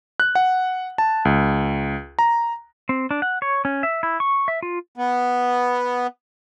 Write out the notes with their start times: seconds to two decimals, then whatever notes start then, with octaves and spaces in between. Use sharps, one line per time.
0.20 F#6
0.35 F#5
0.98 A5
1.25 C#2
2.19 A#5
2.89 C4
3.11 D4
3.22 F#5
3.42 C#5
3.65 C#4
3.83 E5
4.03 E4
4.20 C#6
4.48 E5
4.63 F4
4.96 B3